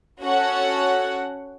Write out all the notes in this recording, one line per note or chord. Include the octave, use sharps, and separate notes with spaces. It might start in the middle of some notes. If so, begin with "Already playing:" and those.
C#4 F#4 A4 C#5 F#5